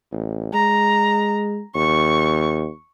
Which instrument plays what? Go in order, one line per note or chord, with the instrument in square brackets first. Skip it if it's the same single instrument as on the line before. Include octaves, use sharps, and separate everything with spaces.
[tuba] A1
[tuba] G#3 [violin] A#5
[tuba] D#2 [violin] C#6